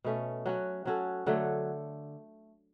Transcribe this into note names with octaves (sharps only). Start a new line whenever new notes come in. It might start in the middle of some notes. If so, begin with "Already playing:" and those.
B2 A3 C#4
F#3 C#4 F#4
F#3 C#4 F#4 A4
D3 F#3 A3